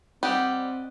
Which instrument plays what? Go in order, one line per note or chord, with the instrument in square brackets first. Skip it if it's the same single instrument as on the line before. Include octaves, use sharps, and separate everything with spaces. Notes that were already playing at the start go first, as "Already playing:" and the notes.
[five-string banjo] G3 G4 [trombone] C4 [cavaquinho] D#5 F#5 G5